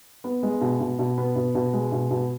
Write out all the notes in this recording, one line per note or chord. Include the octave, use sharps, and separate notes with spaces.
B3
G#3
B2
B2
B2
B3
B2
B2
G#3
B2
B2